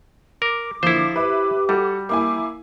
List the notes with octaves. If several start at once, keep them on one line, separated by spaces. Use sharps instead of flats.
A#4 D6
A#2 D3 F3 E4 C5
G4 B4 E5 D6
G3 F#4 A4
A#3 E4 G#5 D6